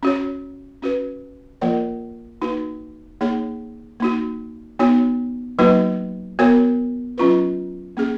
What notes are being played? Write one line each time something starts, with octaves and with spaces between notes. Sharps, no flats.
C#4 F#4 C#5
C#4 F#4 B4
F3 A#3 F4 A#4 C#5
A#3 D#4 F#4 B4
A#3 D#4 G#4 C#5
A#3 D#4 F#4
B3 D#4 F#4 C#5
F#3 A#3 D#4 F#4 B4
B3 F#4 A#4 C#5
F#3 C#4 F4 B4
A#3 C#4 G#4